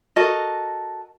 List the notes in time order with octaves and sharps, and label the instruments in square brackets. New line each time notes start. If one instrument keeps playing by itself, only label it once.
[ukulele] F#4 A4 A#4 D#5